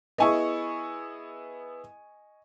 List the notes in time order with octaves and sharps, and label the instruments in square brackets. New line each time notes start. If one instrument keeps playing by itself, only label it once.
[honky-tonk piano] B3 E4 G#4 [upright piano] D#5 G#5 C#6